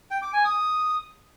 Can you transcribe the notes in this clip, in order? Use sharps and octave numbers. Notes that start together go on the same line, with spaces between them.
G5
D6
G#5
D#6